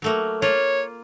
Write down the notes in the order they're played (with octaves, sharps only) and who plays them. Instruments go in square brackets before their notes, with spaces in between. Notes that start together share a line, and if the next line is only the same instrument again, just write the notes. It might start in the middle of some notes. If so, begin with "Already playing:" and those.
[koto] F#3 A3 A#3
[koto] A#3 F4 [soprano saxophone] C#5